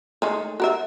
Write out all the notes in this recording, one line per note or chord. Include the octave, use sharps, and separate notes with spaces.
D#3 G#3 A3
F#4 A#4 E5